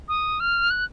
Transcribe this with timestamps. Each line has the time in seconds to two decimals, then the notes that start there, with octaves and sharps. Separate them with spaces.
0.08 D#6
0.40 F6
0.70 F#6